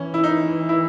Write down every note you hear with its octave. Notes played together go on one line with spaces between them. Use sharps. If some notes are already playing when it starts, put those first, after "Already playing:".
Already playing: E3 C#4
E4
D#4
E4